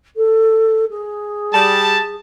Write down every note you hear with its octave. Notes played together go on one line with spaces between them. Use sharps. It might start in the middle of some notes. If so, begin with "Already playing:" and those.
A4
G#4
G3 A5